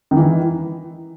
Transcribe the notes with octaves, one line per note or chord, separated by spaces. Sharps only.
D#3
E3